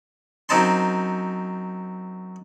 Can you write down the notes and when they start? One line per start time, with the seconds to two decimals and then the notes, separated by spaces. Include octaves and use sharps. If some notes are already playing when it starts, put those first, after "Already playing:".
0.49 F#2 C4 D#4 A5 C6